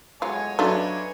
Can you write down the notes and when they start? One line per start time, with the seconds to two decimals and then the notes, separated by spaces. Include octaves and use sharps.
0.22 A2 F#3 G#3 B3 F4 C#5 D#5 G#5
0.59 F#3 A3 D4 F4 B4